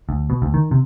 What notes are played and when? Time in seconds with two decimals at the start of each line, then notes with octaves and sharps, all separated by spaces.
0.09 D2
0.30 B2
0.42 D2
0.54 D#3
0.71 C3